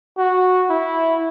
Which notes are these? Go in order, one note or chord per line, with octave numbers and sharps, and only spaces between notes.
F#4
E4